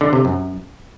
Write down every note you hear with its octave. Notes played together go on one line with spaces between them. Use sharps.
D3
C3
F#2